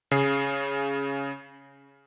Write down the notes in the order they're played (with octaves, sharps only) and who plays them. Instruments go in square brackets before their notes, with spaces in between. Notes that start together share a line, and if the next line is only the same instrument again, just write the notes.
[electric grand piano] C#3 G#4 C7